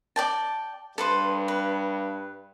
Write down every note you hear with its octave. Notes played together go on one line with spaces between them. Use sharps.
D5 G5 A5
G2 A4 B4 C5
B4